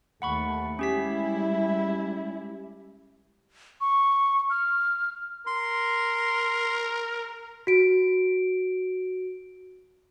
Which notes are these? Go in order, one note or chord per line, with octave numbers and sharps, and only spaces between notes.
D#2 A3 F#5 B5 C#6
G3 G#3 C#4 E4 G4 B6
C#6
F6
A#4 C6
F#4 D7